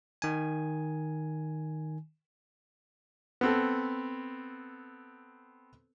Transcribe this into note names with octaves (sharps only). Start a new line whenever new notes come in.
D#3 G#5
B3 C4 A4